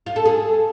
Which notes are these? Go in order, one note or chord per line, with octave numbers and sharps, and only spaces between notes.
F4
A4
G#4